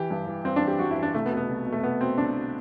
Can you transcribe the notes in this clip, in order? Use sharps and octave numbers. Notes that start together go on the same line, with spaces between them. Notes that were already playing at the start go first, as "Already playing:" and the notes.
Already playing: E3 G4
G2
E3
G2 C4
D4
E3
G4
G2 F#4
E4
E3
D4
C2 A3
B3
B2
B3
C2
B2
A3
C2 B3
B2 C4
C2 D4
B2